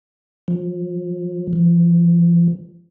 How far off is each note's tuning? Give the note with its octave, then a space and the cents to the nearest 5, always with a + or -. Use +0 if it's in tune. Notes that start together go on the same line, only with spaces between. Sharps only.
F3 +30
F3 -40